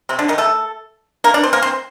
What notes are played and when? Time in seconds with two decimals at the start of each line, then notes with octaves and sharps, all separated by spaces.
0.09 C3 C4
0.19 D3 D4
0.28 D#3 D#4
0.38 A3 A4
1.24 A#3 A#4
1.34 D4 D5
1.43 C4 C5
1.53 A#3 A#4
1.62 C4 C5